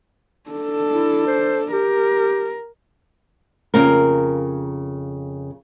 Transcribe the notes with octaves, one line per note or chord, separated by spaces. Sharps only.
D4 A4
E4
C5
G4 A#4
F2 C#3 A#3 A#4